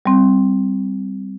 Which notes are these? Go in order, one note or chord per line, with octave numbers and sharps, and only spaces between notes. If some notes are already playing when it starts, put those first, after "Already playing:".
G3 C4